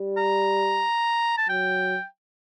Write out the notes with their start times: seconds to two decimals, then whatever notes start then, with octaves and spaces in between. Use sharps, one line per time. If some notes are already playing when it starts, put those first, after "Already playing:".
Already playing: G3
0.17 A#5
1.38 A5
1.49 F#3 G5